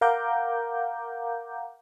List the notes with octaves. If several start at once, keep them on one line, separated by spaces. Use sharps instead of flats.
A#4 F5 F#5 A#5 D6 G6